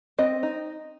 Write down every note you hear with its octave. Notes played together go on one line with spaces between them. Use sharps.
C4 D#5
D#4